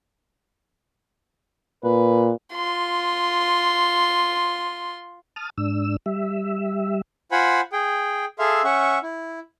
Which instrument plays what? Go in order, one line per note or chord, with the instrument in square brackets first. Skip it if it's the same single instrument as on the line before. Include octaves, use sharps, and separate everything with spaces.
[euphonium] A#2 [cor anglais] B4
[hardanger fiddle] F4 C6
[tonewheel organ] A5 D#6 F6
G#2 D4 E6
G3 E5
[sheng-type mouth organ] F4 C5 F#5 G#5 B5 C6
G#4 G5
G#4 A4 E5 F5 C6
C#4 E5 F#5 C#6
E4